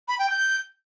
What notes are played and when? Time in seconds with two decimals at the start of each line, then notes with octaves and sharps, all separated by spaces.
0.08 B5
0.19 G5
0.30 G6